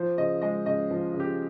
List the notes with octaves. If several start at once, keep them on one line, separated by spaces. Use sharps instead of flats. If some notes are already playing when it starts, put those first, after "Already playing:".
Already playing: F3 C5
C#3 D#5
G#3 D#5
C#3 D#5
F3
C#3
G4